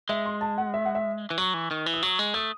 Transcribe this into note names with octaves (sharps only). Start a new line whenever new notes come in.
G#3 E5
C6
A5
F#5
E5
F#5
E5
E3
F#3 C#6
E3
D#3
E3
D#6
F#3 C#6
G#3
A3 D#6